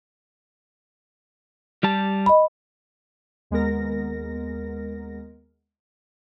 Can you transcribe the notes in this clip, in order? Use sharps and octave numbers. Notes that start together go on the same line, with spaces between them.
G3 G4 A5
D#5 B5
D#2 G#3 B3 A#4 A#6